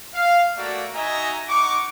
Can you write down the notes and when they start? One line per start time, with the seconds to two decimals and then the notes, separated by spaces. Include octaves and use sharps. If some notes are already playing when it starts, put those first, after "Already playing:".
0.13 F5
0.57 A3 A#3 F#4 D5
0.95 D#4 F#4 D#5 E5 G#5 A#5
1.48 D#4 F#5 C#6 D6